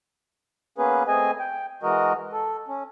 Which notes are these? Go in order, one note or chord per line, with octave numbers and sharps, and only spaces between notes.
A#3 B3 C#4 G#4 B4
A3 C4 G#4 D#5 G#5
G5
E3 G#3 F#4 A#4 D#5
A4
C#4